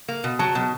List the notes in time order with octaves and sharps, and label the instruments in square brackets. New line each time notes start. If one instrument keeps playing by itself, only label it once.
[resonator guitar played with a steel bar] A#3
B2
[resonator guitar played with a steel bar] F#3 [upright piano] A5
[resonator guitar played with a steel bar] B2